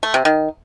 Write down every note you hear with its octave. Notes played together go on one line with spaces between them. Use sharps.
A3
C3
D#3